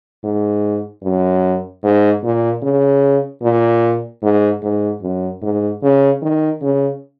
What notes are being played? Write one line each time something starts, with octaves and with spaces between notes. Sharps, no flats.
G#2
F#2
G#2
A#2
C#3
A#2
G#2
G#2
F#2
G#2
C#3
D#3
C#3